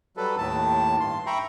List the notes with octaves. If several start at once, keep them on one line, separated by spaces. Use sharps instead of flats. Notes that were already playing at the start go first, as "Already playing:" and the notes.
F#3 G3 A4 B4
D#2 A2 D#3 A5
G2 C6
E5 G5 A#5 B5 C#6